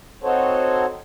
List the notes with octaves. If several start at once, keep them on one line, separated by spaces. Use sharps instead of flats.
C4 D#4 F#4 A4 C5 C#5